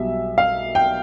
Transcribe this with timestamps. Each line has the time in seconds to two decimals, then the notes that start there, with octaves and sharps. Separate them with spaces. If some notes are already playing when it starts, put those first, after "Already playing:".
Already playing: B1 B2 G3 E5
0.38 F5
0.75 G5